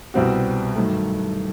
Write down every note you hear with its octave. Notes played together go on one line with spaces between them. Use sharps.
C2 B2 G3 C4 F#4
G2 D#3 F#3 A3